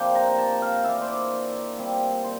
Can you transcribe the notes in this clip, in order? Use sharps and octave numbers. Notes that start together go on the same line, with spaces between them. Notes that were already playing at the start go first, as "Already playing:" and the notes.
Already playing: C3 F3 A#3 D4 G5
A#5
G5
A5
F5
E3 A#3 D4 E5
C5
D5
A#2 G3 C4
C5